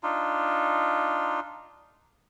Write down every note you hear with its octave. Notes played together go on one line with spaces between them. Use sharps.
D4 D#4 F4